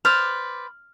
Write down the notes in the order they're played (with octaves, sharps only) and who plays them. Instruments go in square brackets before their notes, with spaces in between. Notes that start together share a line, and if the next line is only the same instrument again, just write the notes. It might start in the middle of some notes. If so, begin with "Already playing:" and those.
[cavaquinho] B4 C5 D5 [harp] F6